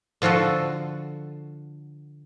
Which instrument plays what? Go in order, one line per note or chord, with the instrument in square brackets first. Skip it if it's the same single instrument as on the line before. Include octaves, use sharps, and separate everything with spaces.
[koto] D3 F3 F4 F#4 A4